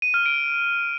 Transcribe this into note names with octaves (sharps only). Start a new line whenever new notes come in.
D#7
F6
D7